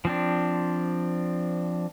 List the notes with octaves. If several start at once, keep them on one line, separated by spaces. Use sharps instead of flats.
F3 C4 D4